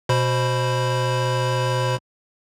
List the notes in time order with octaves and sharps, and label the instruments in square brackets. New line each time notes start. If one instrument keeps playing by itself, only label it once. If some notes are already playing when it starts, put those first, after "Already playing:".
[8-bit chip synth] B2 C5 B5